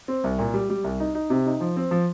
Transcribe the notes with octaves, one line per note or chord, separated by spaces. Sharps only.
C4
C2
A#2
G3
G3
C2
D#4
D#4
C3
D#4
F3
C4
F3